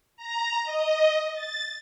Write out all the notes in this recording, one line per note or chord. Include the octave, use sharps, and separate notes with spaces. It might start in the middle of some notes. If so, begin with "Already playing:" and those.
A#5
D#5
A6